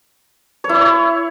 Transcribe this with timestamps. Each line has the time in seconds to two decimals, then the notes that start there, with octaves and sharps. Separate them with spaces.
0.64 C#5
0.69 E4
0.75 C#5